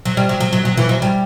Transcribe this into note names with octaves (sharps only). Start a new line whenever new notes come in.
F#3
G3
F#3
F#3
F#3
F#3
E3
F#3
G3